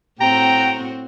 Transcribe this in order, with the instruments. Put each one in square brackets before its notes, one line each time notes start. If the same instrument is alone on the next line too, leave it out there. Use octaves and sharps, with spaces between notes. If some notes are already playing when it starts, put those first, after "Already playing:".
[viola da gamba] A2 C4 F#4 [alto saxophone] G5 [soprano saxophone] A#5